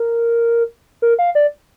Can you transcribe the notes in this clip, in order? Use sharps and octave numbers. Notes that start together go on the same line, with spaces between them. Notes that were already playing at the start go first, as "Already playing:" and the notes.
Already playing: A#4
A#4
F5
D5